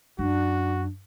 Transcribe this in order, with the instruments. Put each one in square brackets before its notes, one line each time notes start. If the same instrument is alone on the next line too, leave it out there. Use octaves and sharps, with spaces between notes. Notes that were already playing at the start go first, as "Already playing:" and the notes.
[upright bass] F#2 [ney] D4 [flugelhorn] F#4